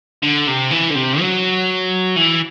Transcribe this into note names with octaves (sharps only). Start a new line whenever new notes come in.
D3
C3
E3
D3
C3
F#3
E3